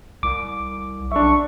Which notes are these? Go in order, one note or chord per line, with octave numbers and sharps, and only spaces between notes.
C2 D6
B1 D4 E5 C#6